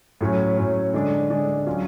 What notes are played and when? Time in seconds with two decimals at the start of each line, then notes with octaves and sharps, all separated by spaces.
0.21 A2 F#3 C#4
0.57 A2 F#3 C#4
0.93 D3 G#3 D4
1.30 D3 G#3 D4
1.66 F#3 C#4 F4